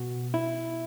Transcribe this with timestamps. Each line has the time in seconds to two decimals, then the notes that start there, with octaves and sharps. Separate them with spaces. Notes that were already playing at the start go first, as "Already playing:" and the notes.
Already playing: B2 F#4
0.34 E4